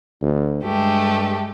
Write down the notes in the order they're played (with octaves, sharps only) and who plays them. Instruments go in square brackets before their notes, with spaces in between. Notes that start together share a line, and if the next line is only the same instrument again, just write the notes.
[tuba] D2
[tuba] G2 [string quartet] G#3 A3 G4